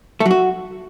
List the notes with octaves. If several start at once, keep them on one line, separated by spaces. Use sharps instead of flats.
A3
F#3
F#4